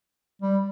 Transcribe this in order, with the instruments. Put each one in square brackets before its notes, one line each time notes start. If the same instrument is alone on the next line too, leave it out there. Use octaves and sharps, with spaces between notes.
[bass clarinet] G3